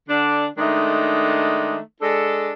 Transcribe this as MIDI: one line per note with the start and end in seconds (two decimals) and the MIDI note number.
0.08 0.45 50
0.08 0.45 62
0.58 1.77 51
0.58 1.77 56
0.58 1.77 57
0.58 1.77 62
0.58 1.77 63
2.01 2.51 56
2.01 2.51 62
2.01 2.51 69